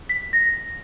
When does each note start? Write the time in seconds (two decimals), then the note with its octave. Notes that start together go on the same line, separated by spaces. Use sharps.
0.09 B6
0.33 A#6